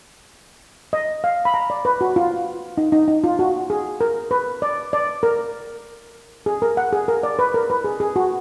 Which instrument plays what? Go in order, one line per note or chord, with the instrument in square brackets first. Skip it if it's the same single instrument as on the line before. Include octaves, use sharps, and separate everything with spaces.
[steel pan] D#5
F5
B5
A#5
D5
B4
F#4
F4
D#4
D#4
D#4
F4
F#4
G#4
A#4
B4
D5
D5
A#4
G#4
A#4
F#5
G#4
A#4
D5
B4
A#4
B4
G#4
G#4
F#4